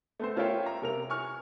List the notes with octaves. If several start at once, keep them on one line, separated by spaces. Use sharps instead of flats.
A3 B3 C4 C5
C#4 F4 A#4 C#5 E5 G5
A#5
C3 A#4 F7
G#5 C#6 F6